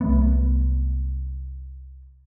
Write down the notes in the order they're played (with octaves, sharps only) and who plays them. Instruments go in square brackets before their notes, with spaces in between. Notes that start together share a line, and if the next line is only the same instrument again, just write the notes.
[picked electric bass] C2 F#3 A3 B3